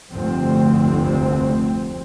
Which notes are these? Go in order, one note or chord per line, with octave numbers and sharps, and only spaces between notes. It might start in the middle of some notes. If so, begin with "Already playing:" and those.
F1 D2 G2 C4